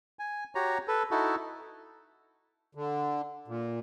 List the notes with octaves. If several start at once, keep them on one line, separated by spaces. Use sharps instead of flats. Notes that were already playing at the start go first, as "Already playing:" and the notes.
G#5
F#4 G4 C#5 A#5
A4 B4
D#4 E4 F#4 A4
D3
A#2